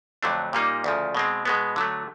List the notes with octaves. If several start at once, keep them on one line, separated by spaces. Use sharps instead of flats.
F2 D3 F#3 A3 D4
A#2 G3 A#3 D#4
D2 C#3 F3
B2 G#3 C4
B2 G#3 B3
D3 F#3 A3